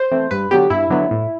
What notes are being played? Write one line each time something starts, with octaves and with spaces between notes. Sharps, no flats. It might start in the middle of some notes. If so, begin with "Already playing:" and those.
Already playing: C5
E3 A3 C4
G2 B4
D3 F#3 B3 G4
G2 E4
D3 F#3 B3
A2